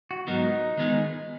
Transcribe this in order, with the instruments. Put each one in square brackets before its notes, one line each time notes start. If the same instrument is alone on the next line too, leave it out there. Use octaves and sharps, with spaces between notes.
[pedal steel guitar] F#4
[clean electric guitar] G#2 F#3 B3 F4 A#4 [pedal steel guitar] D#4
[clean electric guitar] D#3 G#3 B3 F4 G#4